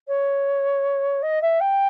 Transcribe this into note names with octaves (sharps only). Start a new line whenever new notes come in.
C#5
D#5
E5
G5